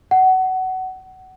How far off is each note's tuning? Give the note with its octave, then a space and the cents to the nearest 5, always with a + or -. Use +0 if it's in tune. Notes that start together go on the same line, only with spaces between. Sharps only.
F#5 +20